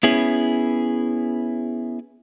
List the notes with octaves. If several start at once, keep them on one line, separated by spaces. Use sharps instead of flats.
B3 C#4 E4 G#4